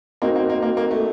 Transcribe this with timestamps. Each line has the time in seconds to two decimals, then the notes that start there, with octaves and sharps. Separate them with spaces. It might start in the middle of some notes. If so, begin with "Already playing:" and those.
0.22 A#3 C4 D#4 F#4 A#4
0.36 A#3
0.50 A#3
0.62 A#3
0.77 A#3
0.91 A3